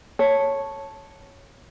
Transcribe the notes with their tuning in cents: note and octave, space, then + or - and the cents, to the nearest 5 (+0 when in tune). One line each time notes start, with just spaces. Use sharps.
C#5 -5 A5 +0